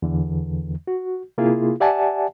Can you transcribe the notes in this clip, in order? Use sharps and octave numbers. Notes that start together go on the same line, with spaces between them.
E2 D3 E3
F#4
C3 A#3 E4 F4 G#4
G4 D5 E5 F#5 G#5 A5